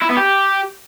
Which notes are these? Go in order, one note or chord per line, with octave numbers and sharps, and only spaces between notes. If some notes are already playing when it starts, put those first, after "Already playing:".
E4
B3
G4